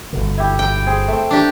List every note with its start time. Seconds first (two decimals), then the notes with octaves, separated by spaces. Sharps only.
0.13 G1 B2 D3
0.38 E4 G4
0.59 G5
0.87 C4 G#4
1.08 A3 C4
1.31 D4 G4